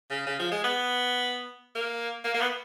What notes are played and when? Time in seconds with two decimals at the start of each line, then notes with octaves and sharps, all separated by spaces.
0.10 C#3
0.27 C#3
0.39 F3
0.51 G#3
0.64 B3
1.75 A#3
2.24 A#3
2.34 A#3
2.41 B3